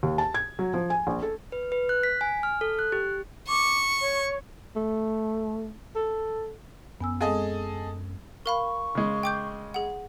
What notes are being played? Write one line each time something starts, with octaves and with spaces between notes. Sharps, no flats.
D#2
A5
G#6
F#3
F3
G#5
A#1
A4
B4
B4
F#6
B6
G#5
F6
A4
F#6
G4
C#6 D6
C#5
A3
A4
F#2 B3 G#5 E6
G#3 C4 G#4 A4 D#5
A#4 F5 B5 C#6
C#3 G#3
G5 D6 G6
G#4 F#5